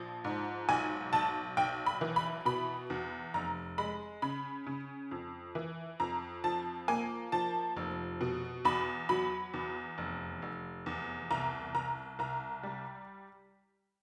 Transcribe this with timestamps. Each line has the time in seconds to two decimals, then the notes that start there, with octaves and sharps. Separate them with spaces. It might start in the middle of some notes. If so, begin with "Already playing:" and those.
Already playing: A#1 F3
0.25 G#2
0.69 B1 G#5
1.13 B1 A5
1.57 B1 G5
1.86 B5
2.01 E3
2.16 B5
2.45 B2 B5
2.90 E2
3.34 F1 A#5
3.78 G#3 B5
4.22 C#3 B5
4.67 C#3
5.11 F2
5.55 E3
6.00 F2 A#5
6.44 F3 A5
6.88 A#3 G#5
7.32 F3 A5
7.77 F1
8.21 B2
8.65 E2 B5
9.09 F#3 B5
9.54 E2
9.98 F1
10.42 F1
10.86 E2
11.31 C2 A#5
11.75 C2 A#5
12.19 C2 A#5
12.63 G3